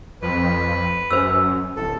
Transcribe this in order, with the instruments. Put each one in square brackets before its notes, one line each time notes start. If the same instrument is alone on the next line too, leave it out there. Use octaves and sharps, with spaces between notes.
[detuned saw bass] F2 [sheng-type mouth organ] B4
[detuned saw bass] F#2 [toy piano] C5 E6
[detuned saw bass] D1 [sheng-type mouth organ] A4